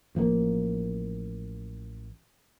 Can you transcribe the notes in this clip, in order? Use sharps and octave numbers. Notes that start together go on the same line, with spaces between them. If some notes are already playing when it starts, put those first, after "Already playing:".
A1 F3 G#3 A#3